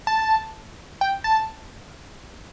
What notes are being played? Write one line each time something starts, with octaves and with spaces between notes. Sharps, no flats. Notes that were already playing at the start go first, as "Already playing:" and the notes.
A5
G5
A5